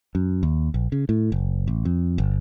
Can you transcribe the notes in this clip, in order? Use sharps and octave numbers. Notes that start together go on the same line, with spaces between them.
F#2
D#2
A#1
C#3
A2
F#1
A1
F2
G1